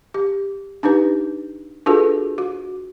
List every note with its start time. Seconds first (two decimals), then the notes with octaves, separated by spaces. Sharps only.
0.14 G4
0.83 D4 D#4 G4 B4
1.86 D4 F4 F#4 G#4 A4 B4
2.38 F#4